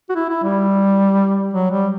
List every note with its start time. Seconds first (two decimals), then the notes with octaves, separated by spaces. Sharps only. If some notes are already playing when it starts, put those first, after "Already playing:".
0.10 F#4
0.16 E4
0.29 E4
0.43 G3
1.53 F#3
1.71 G3